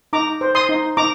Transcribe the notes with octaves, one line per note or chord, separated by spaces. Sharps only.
D#4 A#5 D6
C5
C6 D#6
D#4
D#4 A#5 D6